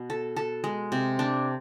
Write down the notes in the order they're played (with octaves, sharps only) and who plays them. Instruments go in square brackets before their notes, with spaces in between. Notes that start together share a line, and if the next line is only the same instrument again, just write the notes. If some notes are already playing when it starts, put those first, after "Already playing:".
Already playing: [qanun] B2
A4
A4
G#3
C3
D4